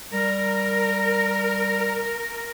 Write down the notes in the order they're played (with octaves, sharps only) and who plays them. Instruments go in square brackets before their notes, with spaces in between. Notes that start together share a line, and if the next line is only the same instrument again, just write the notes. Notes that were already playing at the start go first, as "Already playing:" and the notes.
[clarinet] G3 [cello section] A#4